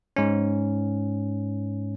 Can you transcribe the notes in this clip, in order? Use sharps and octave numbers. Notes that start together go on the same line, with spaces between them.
G#2 C#4